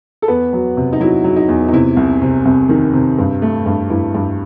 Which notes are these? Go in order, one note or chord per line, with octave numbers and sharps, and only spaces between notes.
A4
E2 B3 B4
F#3
C3
D#4
F#3 E4
F#3
D#4
E2
D#4
C3 E4
C2
C3
C2
D#3
C3
G2
A3
G2
G2 E4
G2